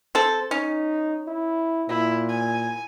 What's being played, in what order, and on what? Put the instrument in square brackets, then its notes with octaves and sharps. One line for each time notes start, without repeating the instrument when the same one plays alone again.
[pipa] C4 A4
[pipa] C#4 [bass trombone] D#4
[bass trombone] E4
[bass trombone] A#2 [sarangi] E4
[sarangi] G#5